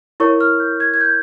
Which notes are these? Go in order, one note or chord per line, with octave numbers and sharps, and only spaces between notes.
E4 A#4 C#5 C#6
F6
G6
G#6
G#6
G6